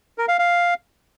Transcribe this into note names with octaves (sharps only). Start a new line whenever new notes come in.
A#4
F5
F5